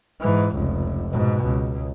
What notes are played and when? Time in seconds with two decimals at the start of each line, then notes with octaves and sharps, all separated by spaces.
0.21 G#2 E3
0.57 F1 C#2
1.09 G#2 B2
1.46 C#2